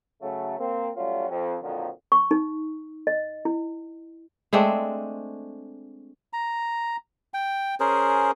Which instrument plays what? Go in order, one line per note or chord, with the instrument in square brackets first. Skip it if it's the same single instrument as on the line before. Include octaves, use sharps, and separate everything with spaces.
[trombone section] C#3 F#3 A3
A#3 C4
F#3 G3 A3 C#4 F4
F2
F2 A#2 D3 D#3 F3 F#3
[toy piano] C#6
D#4
D#5
E4
[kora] G#3 A3 C4 D4
[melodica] A#5
G5
C#4 G#4 A#4 C5